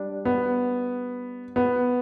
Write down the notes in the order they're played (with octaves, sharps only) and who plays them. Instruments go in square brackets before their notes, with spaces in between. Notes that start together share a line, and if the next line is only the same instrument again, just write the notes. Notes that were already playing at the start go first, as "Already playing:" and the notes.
Already playing: [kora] G3 D4
[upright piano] B3
B3